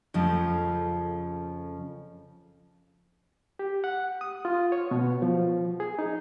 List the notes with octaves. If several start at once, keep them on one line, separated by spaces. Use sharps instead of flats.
F2 C#3 F3 A3
G4
F#5
D#6
F4
C#5
B2
F3
G#4
D#4